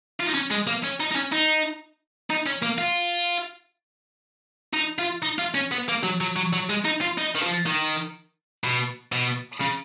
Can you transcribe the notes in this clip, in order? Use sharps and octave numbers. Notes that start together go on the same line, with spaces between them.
F4
D#4
C#4
G#3
A#3
C#4
D#4
D#4
C#4
D#4
D#4
C#4
A#3
F4
D#4
F4
D#4
F4
C#4
B3
A#3
F#3
F#3
F#3
F#3
G#3
D#4
F4
D#4
D#3
F3
D#3
B2
B2
C#3